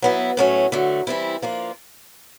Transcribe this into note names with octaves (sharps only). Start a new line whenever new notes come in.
F#3 B3 E4
A2 F#3 A3 C#4
D3 F#3 A3
E3 G3 C4 E4
F3 A#3 D4 F4